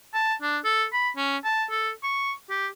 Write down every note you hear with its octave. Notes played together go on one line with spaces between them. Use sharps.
A5
D4
A4
B5
C#4
A5
A4
C#6
G4